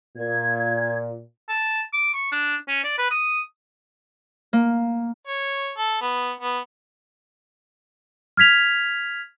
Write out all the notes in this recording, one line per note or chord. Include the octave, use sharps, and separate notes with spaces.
A#2 G#6
A5
D6
C#6
D4
C#4
D5
B4
D#6
A#3
C#5
A4
B3
B3
F6 G#6 B6 F7